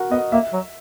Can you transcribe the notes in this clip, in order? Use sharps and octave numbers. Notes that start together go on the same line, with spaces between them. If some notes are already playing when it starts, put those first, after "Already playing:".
Already playing: F#4 A#4
B3 D#5
A#3 E5
F#3